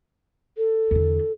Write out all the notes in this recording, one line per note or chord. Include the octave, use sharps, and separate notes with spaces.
A4
E2 D3